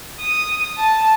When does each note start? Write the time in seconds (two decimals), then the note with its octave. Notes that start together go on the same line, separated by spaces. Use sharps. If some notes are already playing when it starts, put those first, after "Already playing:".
0.20 D#6
0.78 A5